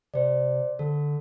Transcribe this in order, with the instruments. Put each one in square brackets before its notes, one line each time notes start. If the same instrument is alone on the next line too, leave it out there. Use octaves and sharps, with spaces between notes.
[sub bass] C3 [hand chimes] C5 D5
[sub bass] D3 [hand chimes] A4